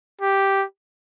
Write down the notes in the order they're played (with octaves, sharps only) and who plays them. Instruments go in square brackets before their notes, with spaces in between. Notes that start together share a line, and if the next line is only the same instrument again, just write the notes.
[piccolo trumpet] G4